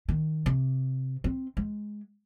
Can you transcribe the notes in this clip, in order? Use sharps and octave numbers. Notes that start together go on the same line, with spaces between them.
D#3
C3
C4
G#3